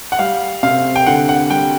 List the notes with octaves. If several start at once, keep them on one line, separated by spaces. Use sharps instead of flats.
F#5
G3 F5
C3 F5
G5
D3 F#5
F#5
G3 G5